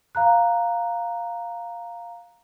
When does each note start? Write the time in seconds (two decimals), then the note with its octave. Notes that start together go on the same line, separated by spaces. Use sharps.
0.15 F5 A#5 F#6